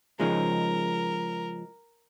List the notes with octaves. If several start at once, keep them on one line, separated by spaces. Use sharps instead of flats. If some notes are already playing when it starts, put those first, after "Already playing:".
C#3 F3 G#3 D#4 A#4